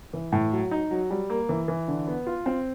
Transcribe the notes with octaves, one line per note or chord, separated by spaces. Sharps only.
E3
A2
F#3
D#4
F#3
G3
A#3
E3
E3
D3
B3
F4
C4